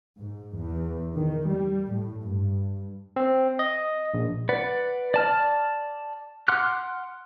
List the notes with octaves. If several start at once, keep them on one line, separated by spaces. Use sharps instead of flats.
G#2
E2
D#3
G3
A2
G2
C4
D#5
A#1
B4 D5 F#5
D5 A5 F6
F#5 C6 D6 F6 F#6